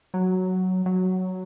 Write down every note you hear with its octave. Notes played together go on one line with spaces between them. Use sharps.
F#3
F#3